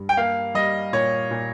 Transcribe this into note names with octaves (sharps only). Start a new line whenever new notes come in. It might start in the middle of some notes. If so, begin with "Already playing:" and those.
Already playing: G2
G5
A#3 F5
G3 D#5
A#2 C#5
A#2